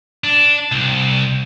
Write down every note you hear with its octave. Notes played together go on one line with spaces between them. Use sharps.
D4
C2